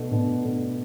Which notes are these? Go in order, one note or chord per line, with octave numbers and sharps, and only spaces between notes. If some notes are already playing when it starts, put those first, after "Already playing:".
Already playing: B2 A3 D4
B2 A3 D4
B2 A3 D4